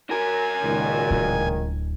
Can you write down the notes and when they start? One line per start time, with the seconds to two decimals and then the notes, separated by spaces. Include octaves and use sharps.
0.11 F#4 A#4 G#5
0.64 C#2 A#2 D#3
1.11 D1